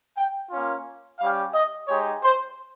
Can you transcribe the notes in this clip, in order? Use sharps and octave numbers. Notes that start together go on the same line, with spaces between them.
G5
A#3 C#4 F4
G3 C#4 G4 F5
D#5
G#3 D#4 G4 C#5
C5